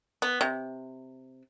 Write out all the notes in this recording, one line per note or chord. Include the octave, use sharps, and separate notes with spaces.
B3
C3